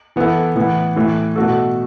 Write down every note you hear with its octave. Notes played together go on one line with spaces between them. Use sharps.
E3 B3 E4 A4
A2 E3 B3
A2 E3 A3
B2 A3 F#4 A4